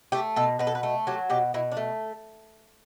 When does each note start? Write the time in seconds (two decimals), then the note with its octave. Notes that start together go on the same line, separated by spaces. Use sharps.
0.12 A3 G4
0.36 B2 A4
0.59 B2 B4
0.67 A4
0.75 B4
0.83 A3
1.07 F#3 G4
1.30 B2 G4
1.54 B2 E4
1.72 D4
1.77 A3